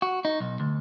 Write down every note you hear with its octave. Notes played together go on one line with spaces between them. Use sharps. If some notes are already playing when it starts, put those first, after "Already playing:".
F#4
D#4
B1
D2